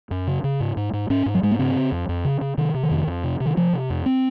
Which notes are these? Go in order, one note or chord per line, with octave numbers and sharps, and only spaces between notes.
F#2
C#3
C#3
G#2
G#2
G#2
G#2 C#4
G#2
F#3
G#2 G#3
A#3
C#3 C4
C#3
F2
F2
C#3
C#3
C3 D#3
C3
D#3
F2
F2
C3
C3
D#3
C3 F3
C3
F2
C4